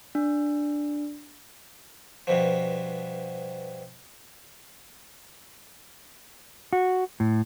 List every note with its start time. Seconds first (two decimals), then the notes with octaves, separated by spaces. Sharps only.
0.15 D4
2.27 G2 B2 F3
6.73 F#4
7.20 A2